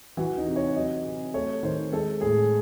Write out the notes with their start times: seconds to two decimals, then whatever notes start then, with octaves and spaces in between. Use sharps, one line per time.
0.17 E3 F#4
0.38 D#4
0.46 C3
0.56 C#5
0.76 F#3 D#5
1.04 C3
1.34 A3 C#5
1.63 D#3 C5
1.92 G#3 A4
2.21 A2 G#4